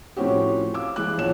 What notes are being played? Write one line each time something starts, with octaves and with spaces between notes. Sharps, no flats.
A2 F3 C4 C#4 F#4 G4
F5 D6 E6
E3 G#3 G#4 D6 F#6
B1 F3 C#5 E7